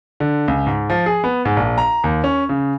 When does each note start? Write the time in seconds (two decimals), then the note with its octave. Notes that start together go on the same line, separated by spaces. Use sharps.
0.20 D3
0.48 C#2
0.67 G#2
0.90 F3
1.06 G#4
1.24 B3
1.45 G#2
1.57 A#1
1.78 A#5
2.04 D#2
2.24 C#4
2.49 C#3